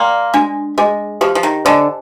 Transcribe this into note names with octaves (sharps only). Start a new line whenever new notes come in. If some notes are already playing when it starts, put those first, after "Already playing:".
Already playing: A#3 D5 G5 C6
G#3 D4
G#3 G#4 D#5
F3 G4
F3
D#3
D3 C5 D#5 G#5